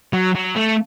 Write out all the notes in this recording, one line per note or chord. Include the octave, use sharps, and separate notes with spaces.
F#3
F#3
A3